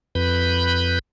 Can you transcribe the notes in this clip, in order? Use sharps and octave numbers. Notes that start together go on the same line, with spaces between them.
F2 B4 B5 G6